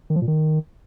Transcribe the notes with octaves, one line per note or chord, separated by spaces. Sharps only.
D#3
F3
A#2
D#3